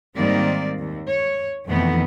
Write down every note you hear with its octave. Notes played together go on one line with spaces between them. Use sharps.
G#2 D#3 G3 A#3 C4 D5
D#2
C#5
F2 B2 D#3 E3 A3 B3